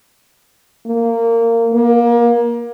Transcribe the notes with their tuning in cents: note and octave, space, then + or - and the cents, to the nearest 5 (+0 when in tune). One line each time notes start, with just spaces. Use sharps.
A#3 -20
A#3 +25